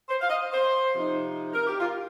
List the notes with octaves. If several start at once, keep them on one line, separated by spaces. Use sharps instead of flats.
C5
F5
D#5
C5
C3 F3 D#4
A#4
G4
F4